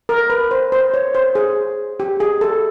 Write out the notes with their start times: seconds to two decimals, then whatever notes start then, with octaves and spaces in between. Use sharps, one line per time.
0.09 A#4
0.30 B4
0.51 C5
0.72 C5
0.94 C#5
1.15 C5
1.35 G#4
2.00 G4
2.20 G#4
2.41 A4